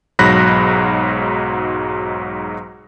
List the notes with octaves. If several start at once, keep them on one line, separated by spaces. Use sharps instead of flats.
B1 G#2 F#3 B5 F#6 A#6